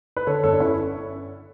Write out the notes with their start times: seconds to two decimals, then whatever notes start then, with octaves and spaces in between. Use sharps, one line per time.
0.17 B4
0.27 D3 A4 C#5
0.43 G1 A4 C#5
0.52 D4
0.60 C#4 E4